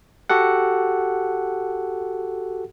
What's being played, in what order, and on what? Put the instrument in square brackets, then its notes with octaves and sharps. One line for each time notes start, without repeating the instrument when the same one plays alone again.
[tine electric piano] F#4 G4 A4 F#5